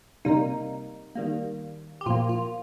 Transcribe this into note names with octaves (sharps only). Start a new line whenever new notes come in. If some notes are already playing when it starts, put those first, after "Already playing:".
C3 G3 A#3 D#4
D#3 G3 A#3
G4
A#2 F3 A#3 F4
F4